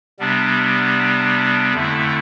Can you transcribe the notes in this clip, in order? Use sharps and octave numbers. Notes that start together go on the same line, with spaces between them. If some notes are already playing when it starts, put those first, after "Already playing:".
C3 G3 B3 D4
F2 D3 A3 E4